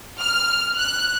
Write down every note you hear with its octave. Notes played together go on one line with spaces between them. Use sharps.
F6
F#6